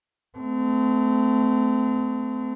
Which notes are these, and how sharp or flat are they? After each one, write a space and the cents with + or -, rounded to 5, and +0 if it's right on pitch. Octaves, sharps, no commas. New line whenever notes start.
A3 -10 C4 -35